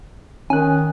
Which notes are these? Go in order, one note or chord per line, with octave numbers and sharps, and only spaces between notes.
D#3 C#4 G#5 F#6